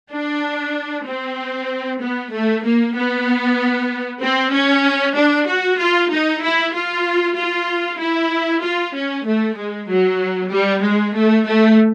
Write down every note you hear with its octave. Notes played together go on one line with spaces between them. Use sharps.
D4
C4
B3
A3
A#3
B3
C4
C#4
D4
F#4
F4
D#4
E4
F4
F4
E4
F4
C#4
A3
G#3
F#3
G3
G#3
A3
A3